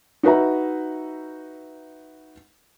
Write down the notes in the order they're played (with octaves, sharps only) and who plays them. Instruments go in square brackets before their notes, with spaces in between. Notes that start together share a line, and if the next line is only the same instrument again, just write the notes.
[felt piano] D#4 F#4 B4 E5 A#5